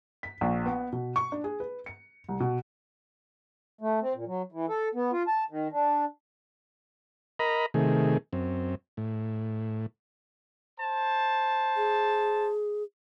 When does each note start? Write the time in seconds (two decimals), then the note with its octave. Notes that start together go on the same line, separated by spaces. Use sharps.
0.23 B6
0.41 A#1
0.66 B3
0.93 B2
1.16 C#6
1.32 D4
1.44 G#4
1.60 B4
1.86 C#7
2.29 C2
2.40 B2
3.81 A3
4.01 C4
4.14 A#2
4.27 F#3
4.52 E3
4.69 A4
4.95 B3
5.12 F4
5.28 A5
5.50 D#3
5.72 D4
7.39 A#4 D#5 A#5 B5
7.74 C3 D#3 A3 G#4
8.33 F#2 C4
8.97 A2
10.80 C5 A5
11.77 G#4